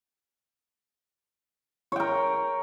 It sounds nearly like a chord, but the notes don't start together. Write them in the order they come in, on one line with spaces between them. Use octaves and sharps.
C#5 G5 A#4